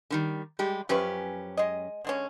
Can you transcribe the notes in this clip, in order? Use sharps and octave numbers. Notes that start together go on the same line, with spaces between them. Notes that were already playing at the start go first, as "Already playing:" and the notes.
D3 D#3 G3
G3 G#3 G4
F#2 F3 C#4 G4 B4 C#6
G#3 D#5
D3 G#3 C#4